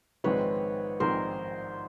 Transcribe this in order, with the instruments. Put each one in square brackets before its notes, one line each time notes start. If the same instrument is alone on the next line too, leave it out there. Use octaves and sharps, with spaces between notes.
[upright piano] A#1 G#2 D#3 G#3 C4 [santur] B4 C#5
[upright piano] A#1 G#2 D#3 G#3 C4 [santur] A#4 C5